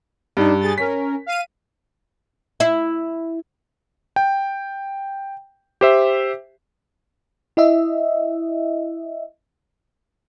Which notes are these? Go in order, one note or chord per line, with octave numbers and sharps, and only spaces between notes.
G2 D4 D#4
G#4 A6
C#4 A#4 B6
F5 D#7
E4
G5
G4 C5 E5
E4 D#5 E5